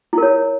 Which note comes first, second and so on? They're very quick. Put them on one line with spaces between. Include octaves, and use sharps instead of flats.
E4 A#4 C#5